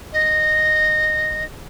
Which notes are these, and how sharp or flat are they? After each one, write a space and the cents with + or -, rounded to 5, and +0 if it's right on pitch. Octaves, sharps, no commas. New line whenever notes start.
D#5 -15